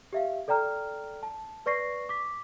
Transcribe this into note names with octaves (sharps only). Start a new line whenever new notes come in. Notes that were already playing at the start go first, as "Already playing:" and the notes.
G4 E5 F5
A4 D5 G5 A#5 F6
A5
B4 D5 C#6 A#6 C7
D6 B6